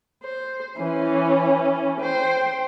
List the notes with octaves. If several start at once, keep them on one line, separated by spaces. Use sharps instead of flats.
C5
E3 C#4
C5 G5